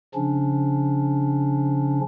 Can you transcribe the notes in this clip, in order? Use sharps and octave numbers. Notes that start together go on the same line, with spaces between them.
C#3 F3 C#4 D4